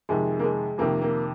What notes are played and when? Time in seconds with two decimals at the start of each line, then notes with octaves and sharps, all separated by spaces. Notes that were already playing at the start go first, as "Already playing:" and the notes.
0.09 F2 C3 D#3 G#3
0.39 A#3
0.44 G#3
0.78 F2 C3 D#3 A#3
1.02 A#3